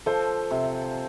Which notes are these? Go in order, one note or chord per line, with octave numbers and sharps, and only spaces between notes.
F3 A4 C5
C3